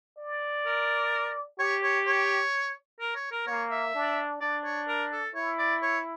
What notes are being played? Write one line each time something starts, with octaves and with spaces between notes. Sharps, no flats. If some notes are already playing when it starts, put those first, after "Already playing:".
D5
A#4
G4 C#5
C#5
C#5
A#4
C#5
A#4
A#3 C#5
E5
D4
D4 D5
C#5
A#4
A4
E4 C#5
D5
C#5